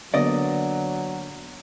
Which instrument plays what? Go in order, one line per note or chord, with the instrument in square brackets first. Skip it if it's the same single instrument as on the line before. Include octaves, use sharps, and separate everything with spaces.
[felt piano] D3 A#3 B3 [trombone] F#3 [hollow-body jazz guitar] D5 D#5